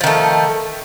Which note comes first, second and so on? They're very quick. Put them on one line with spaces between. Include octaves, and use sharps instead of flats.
F3 D#3 A3